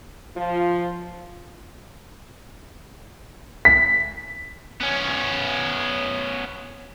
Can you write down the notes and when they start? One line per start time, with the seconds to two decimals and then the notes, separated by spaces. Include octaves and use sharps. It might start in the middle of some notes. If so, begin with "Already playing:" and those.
0.37 F3 F4
3.65 B6
4.81 B3 C#4